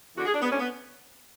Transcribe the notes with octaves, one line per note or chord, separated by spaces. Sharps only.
E2 D3 F#4
G#4
D4
B3
D2 D3 C#4
B3